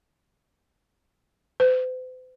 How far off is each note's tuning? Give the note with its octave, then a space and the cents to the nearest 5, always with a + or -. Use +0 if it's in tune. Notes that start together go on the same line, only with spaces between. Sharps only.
C5 -45